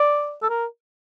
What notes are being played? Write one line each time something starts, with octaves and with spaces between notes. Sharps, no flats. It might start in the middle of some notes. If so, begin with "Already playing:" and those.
Already playing: D5
A4
A#4